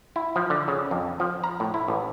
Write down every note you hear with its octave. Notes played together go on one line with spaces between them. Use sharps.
E4
F3
D3
C#3
F2
F3
A#5
A2
E4
A1